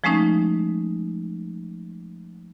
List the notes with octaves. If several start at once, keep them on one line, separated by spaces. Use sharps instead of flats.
F3 G#3 A3 C#4 D#4